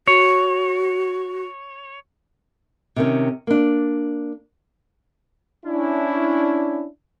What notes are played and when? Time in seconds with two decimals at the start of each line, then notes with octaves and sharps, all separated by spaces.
0.08 F#4 C#5
2.96 C3 D#3 C#4
3.47 A#3 D4
5.65 C#4 D4 E4